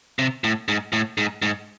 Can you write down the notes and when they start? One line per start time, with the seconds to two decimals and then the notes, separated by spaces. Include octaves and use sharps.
0.19 C3
0.44 A2
0.68 G#2
0.93 A2
1.18 G#2
1.42 G#2